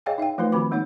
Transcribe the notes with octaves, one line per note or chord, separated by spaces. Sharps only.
G#4 C#5 D#5 F5 G5 G#5
D#4 E5 F5 G5
F3 A3 D#4 F4 B4 C5
D#3 C4 F#4 B5 D6
G#3 A#3 D#4 C#5 F#5